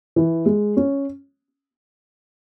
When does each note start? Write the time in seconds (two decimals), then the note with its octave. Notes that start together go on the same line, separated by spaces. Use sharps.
0.16 E3
0.46 G#3
0.77 C#4